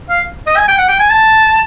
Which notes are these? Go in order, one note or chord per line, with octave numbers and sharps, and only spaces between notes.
F5
D#5
G#5
G5
F#5
G5
G#5
A5